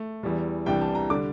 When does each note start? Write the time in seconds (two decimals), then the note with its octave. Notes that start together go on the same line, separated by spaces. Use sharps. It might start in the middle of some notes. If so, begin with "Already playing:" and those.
Already playing: A3
0.23 E2 E3 G3
0.66 C2 C3 E3 G3 D4 G5
0.81 A5
0.95 A#5
1.10 D3 G3 D4 D6